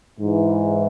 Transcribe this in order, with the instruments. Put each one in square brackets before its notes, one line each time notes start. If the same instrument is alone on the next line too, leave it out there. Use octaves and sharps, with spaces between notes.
[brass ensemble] G#2 E3